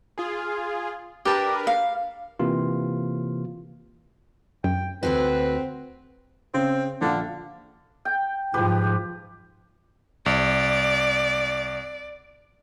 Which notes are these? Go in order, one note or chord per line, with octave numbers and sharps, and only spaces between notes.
F4 G#4
D4 G4 A#4 B4 A5
F5
C3 E3 A#3 F4
F#2 G5
D2 G#2 C4 F#4 B4
C#3 C4
A#1 D3 F5
G5
G#2 F3 G4 B4
C2 D5